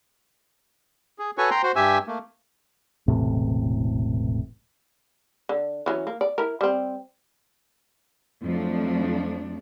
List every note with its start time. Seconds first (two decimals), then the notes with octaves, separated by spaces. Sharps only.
1.19 G#4
1.38 F#4 A4 B4 C#5 G#5 C#6
1.51 G5 A#5 C6
1.63 F#4 C5
1.76 G2 G4 E5 G#5 E6
2.07 A3 A#3
3.08 E1 A1 A2 C3
5.49 D3
5.86 E3 F#3 C#4
6.07 A#3
6.21 D5
6.38 E4 A#4
6.61 G3 C4
8.43 F2 F3 F#3 A3 D4